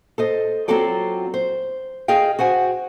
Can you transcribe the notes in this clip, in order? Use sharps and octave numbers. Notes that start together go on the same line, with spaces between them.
A4 C5 D#5
F#3 C4 F4 F#4 A4 D5
C5
G#4 D#5 F5 G5
F#4 C5 F#5 G#5